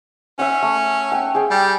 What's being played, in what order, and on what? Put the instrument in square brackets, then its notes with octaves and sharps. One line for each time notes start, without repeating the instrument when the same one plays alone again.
[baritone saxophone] C#4 [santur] E5 F#5
[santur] A3
F#5 G5
G#4 G5
[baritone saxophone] G3